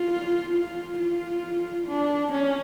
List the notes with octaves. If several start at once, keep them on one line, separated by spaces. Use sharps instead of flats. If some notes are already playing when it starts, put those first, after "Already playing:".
Already playing: F4
F4
F4
D4
C#4